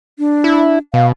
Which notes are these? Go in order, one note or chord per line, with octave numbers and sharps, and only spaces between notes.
D4
E4
B2 F5